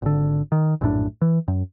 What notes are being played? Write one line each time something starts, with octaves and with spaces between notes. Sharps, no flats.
G#1 D3
D#3
A#1 F#2 A2 D4
E3
F#2